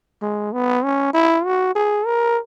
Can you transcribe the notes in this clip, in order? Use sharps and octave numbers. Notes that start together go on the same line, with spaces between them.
G#3
B3
C#4
E4
F#4
G#4
A#4